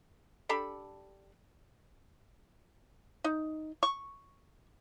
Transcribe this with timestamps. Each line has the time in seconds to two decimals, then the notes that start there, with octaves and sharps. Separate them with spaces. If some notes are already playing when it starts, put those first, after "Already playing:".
0.49 D4 G4 A4 B5
3.24 D#4
3.83 C#6